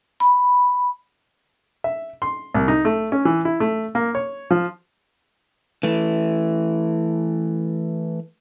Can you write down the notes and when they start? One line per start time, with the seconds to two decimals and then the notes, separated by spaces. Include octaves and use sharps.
0.20 B5
1.84 E5
2.22 C6
2.55 C2
2.68 D#4
2.85 A3
3.12 C#4
3.25 E3
3.45 E4
3.60 A3
3.95 A#3
4.15 C#5
4.51 F3
5.83 E3 A3